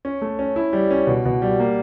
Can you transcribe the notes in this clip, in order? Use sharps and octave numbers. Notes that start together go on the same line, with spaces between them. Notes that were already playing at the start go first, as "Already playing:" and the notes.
C#4
A3
C#4
E4
G3
C#4
B2
B2
G3
A#3